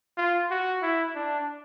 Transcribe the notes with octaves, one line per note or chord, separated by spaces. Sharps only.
F4
F#4
E4
D4